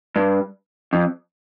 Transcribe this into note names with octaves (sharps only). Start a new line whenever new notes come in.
G2
F2